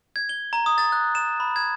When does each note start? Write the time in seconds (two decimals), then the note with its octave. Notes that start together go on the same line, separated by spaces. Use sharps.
0.16 G#6
0.29 G7
0.53 A#5
0.66 D#6
0.78 A6
0.92 F#6
1.15 E7
1.40 B5
1.56 G#6